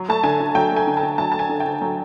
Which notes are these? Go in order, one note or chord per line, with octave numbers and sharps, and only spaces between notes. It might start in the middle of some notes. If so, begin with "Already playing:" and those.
Already playing: F#3
A3 A5
D3 G#5
D3
F#3 G5
A3
G#5
D3
A5
D3
F#3 A5
A3 A5
G#5
D3
D3 G5
F#3